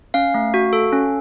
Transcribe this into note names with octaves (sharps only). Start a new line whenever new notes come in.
C#4 F5
A3
F#4
A4
C#4